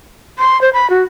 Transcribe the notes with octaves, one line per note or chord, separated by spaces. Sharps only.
C6
C5
B5
F#4